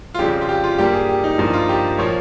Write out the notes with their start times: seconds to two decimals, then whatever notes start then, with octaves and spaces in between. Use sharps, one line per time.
0.14 F4
0.19 F2 C#3 G3 G4
0.41 F4
0.49 G4
0.64 F4
0.78 G2 G3 A#3 G4
0.94 G#4
1.09 G4
1.24 D#4
1.38 G2 F3 A#3 D#4
1.53 F4
1.69 G4
1.98 A#2 F3 A#3 C#5